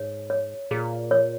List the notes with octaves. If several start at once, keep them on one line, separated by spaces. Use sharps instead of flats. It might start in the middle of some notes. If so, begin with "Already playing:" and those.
Already playing: G#2 C#5
C#5
A#2 G#4
C#5